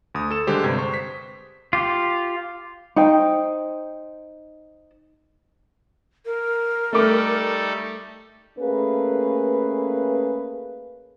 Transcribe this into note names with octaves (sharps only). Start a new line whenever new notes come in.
D2 D#6
A4 E7
D3 G3 G#3 G4 C5
G2 C3 B4 G#6
C5 C#6
B6
F4 G4
D#4 C5 G5
A#4
G3 A3 D#4 A4 D6
A3 A#3 C#4 G#4 B4